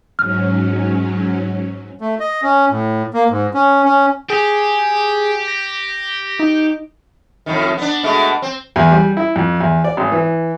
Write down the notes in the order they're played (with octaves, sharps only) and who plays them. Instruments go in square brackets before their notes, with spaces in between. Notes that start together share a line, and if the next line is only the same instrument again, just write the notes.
[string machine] G#2 F#3 C#4 [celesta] F6
[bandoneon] A3
D#5
C#4
A2
A#3
G#2
C#4
C#4
[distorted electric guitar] G4 [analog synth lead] G#4
[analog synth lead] A#6
D#4
[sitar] F2 A2 D#3
B3 D4
B2 G#3 A3
C4
[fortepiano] E2
G3
E4
F2
E2
D5
G#1
E3